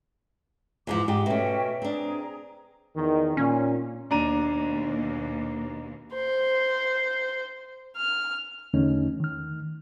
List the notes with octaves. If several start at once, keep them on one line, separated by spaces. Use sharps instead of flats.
E2 G#2 F3 D6
G#2 G4
B2 A3 C#4 E5 G5
C4 D4 G#4 A#5
E2 D#3
A#2 C#4
D#2 B2 A#3 D4 A#5 D#7
C5
F6
E2 D3 A3 C#4 D#4
D#3 F6